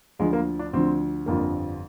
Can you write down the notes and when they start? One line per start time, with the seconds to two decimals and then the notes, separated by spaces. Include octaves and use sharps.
0.19 D2 D3 F3 G#3
0.33 A#3
0.59 D4
0.73 D2 D3 F3 C4
1.26 G1 F2 D3 F3 A#3